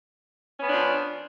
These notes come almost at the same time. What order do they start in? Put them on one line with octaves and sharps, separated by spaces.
C#4 B3 D4 F3